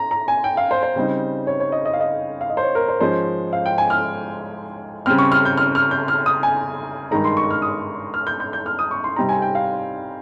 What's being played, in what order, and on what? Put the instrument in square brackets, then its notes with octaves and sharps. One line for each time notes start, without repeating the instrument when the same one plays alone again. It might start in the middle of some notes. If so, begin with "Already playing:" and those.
Already playing: [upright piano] A#5
A#5
G#5
G5
F5
C5
C5
C#3 G3 C4 D#4
C#5
C#5
D#5
D#5
F5
D#5
F5
D#5
C5
C#5
A#4
C5
G#2 F3 G#3 C#4 C5
F5
G5
G#5
F6
C#3 G3 C4 F6
C#6
F6
G6
F6
F6
G6
F6
D#6
G#5
G2 D#3 G#3 D#4 A#5
C6
C#6
F6
D#6
F6
G6
G6
G6
F6
D#6
C#6
C6
C3 G3 C4 D#4 A#5
G#5
G5
F5